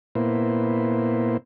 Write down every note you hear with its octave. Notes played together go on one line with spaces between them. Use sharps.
A#2 A#3 B3 E4 C5